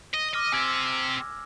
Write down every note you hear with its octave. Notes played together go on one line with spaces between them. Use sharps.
D#5
D#5 D6 F6 A#6
C4 G4 G#5 E6 G#6